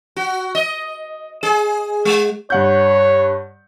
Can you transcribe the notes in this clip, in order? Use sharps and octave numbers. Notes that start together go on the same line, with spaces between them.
F#4
D#5
G#4
G#3
G2 C#5 F#5 G6